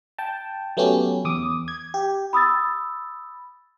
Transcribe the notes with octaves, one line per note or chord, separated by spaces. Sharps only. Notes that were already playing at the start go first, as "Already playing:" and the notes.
G5 A5
F#3 A3 B3 C#4 G4
E2 D6 D#6
G#6
G4
B5 D#6 E6 A6